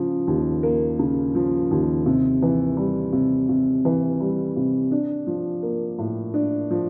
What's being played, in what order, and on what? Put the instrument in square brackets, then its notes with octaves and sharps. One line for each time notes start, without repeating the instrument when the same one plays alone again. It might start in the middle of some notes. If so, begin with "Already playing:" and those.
Already playing: [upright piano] C#3 F3
D#2
A#3
C#3
F3
D#2
C3
E3
G3
C3
C3
E3
G3
C3
D4
F3
A#3
A2
D4
F3